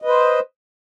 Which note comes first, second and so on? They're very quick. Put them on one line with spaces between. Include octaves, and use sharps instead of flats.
D#5 B4 C5